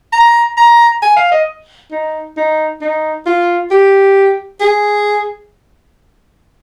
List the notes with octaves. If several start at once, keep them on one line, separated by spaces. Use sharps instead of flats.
A#5
A#5
G#5
F5
D#5
D#4
D#4
D#4
F4
G4
G#4